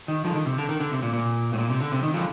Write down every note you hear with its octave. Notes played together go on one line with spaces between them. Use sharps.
D#3
D3 F3
D#3
C3
D3
D#3
D3
C3
A#2
A#2
A2
A#2
C3
D3
C3
D#3
D3 F3